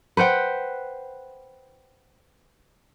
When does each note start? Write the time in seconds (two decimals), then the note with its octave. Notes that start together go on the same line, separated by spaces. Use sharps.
0.17 B4 C5 F#5 G5